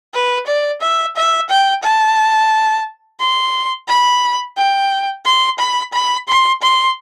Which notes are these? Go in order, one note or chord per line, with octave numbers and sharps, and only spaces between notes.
B4
D5
E5
E5
G5
A5
C6
B5
G5
C6
B5
B5
C6
C6